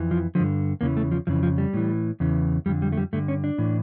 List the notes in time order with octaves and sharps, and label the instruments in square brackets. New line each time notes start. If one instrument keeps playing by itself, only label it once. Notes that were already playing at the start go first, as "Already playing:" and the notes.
Already playing: [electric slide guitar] F2 E3
F3
G2 D3 F3
E2 C#3 E3 A#3
A3
F3
F2 C#3 E3 F3
F3
G3
A2 E3
E2 C#3 E3
F2 G3
D3
G3
A3
G3
G2 D3 A3
C#4
D4
A2 E3